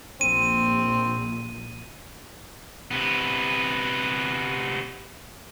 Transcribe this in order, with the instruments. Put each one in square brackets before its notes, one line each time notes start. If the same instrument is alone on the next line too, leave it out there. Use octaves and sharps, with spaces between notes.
[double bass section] A#1 [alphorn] C4 [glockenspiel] D#7
[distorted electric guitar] C3 B3